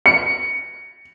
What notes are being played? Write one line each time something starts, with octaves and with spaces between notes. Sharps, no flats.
C#7